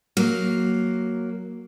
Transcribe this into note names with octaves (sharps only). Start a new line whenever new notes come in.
F#3 A#3